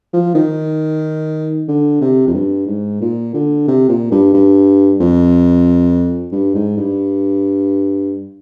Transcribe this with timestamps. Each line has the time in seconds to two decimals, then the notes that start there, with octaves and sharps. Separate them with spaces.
0.13 F3
0.35 D#3
1.68 D3
2.01 C3
2.27 F2
2.34 G2
2.67 G#2
3.01 A#2
3.34 D3
3.68 C3
3.89 A#2
4.12 G2
4.34 G2
5.00 F2
6.32 G2
6.54 G#2
6.77 G2